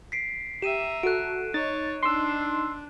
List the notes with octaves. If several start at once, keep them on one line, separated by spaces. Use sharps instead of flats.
B6 C7 D7
G4 E5 A#5 D#7 E7
F#4 A4 F#6 D7
D#4 C#5 A6
D4 C6 E6